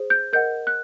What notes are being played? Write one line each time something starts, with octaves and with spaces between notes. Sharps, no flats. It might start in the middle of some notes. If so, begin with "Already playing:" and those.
Already playing: G#4 C5
G6
A#4 D#5 F#5 G6
F#6